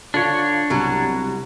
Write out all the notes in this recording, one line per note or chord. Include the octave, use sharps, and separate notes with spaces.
D3 D4 F4 C#5
C2 B2 F#3